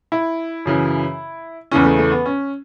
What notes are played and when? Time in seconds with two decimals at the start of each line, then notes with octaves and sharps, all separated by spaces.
0.12 E4
0.65 F#2 C#3 E3
1.71 E2 C#3 E3 C#4
1.85 A3
1.99 A3
2.12 B3
2.26 C#4